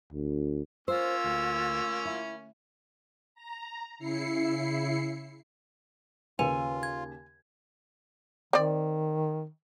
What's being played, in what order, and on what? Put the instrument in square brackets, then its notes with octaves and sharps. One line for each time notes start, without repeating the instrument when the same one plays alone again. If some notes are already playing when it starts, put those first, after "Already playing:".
[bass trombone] D2
[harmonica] A#3 C#4 [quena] F4 [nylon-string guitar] C5 [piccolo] E6
[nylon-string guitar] D2
E4
[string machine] A#5
C#3 E4 C7 C#7
[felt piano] D#2 C#3 [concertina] F4 [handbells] B4 [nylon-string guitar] G#5
[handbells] G#6
[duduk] D#3 [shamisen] C4 D5